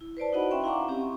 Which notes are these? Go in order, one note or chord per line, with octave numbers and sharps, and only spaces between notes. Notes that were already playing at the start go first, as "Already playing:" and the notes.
E4
B4 C5 D5 A5
D#4 E4 F#4 D#5 F#5 B5
C#4 E5 G5 C6
E4 F5 F#5 A#5 C#6 D6
C4 C#4 G4